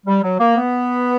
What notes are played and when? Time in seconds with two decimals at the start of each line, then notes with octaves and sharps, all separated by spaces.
0.07 G3
0.23 F#3
0.40 A#3
0.57 B3